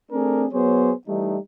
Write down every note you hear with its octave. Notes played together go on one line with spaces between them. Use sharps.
A3 C4 D4 G#4 A#4
F#3 B3 G#4 C5 C#5
E3 G3 A3 D#4